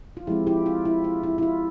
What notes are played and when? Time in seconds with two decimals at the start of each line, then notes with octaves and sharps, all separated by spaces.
0.17 F4
0.27 F3 G#3 C4 E4 G4
0.47 E4 G4
0.66 F4
0.85 E4
1.04 F4
1.23 E4
1.38 E4
1.42 F4